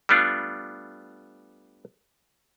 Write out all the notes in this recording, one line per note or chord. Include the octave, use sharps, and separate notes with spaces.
G3 A3 B3 D4 F4